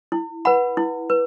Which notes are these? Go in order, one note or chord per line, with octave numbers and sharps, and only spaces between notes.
E4
B4 F#5 B5
E4
B4